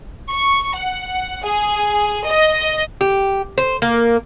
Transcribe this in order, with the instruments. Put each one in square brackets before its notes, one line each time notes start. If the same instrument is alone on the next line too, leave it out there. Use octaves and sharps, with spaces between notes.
[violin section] C#6
F#5
G#4
D#5
[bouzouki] G4
C5
A#3